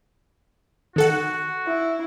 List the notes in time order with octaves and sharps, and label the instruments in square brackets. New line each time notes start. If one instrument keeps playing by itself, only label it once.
[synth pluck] D#3 A4 F#5 [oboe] F#4
[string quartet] E4